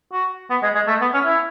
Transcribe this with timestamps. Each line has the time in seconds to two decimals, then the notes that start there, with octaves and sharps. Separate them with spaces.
0.12 F#4
0.50 B3
0.63 G#3
0.75 G#3
0.88 A3
1.01 B3
1.14 C#4
1.26 E4